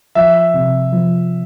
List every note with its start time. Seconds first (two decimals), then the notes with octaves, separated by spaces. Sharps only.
0.15 F3 E5
0.54 C3
0.93 F3